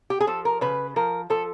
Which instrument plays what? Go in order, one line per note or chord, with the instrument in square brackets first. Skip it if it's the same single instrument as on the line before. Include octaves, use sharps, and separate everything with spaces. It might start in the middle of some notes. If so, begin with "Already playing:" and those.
[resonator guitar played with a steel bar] G4
G#4
F3 A4
A#4
C#3 B4
F3 A#4
F3 A4